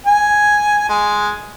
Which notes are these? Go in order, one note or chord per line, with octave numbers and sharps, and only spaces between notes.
G#5
G#3